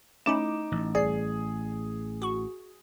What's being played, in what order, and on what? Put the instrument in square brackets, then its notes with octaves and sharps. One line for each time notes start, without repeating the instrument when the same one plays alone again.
[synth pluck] A3 C#4 E4 [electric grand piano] D#4 D6 E7
[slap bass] A1
[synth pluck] C2 D5 C7 [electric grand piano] G#4
[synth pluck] F#4 C#6